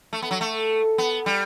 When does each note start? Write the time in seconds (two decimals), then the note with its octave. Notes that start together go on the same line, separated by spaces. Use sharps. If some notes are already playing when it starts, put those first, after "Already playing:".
0.13 A3
0.22 B3
0.31 F#3
0.41 A3
0.98 B3
1.26 G3